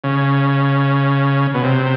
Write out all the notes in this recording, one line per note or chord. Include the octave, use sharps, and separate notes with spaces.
C#3
B2
C3